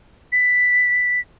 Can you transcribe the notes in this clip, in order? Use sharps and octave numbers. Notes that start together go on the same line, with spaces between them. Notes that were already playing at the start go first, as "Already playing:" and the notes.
B6